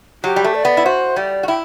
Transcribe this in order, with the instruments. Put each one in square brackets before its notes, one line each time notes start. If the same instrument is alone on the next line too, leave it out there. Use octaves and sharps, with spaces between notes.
[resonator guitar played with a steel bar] F#3 [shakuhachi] G4
[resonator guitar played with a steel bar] G3
A3
[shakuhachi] D5
[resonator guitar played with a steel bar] B3
E4
[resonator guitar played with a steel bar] F#4 [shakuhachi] C5
[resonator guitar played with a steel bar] G3 [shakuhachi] D5
[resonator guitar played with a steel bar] F#4
[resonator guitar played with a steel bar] E4 [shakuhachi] G5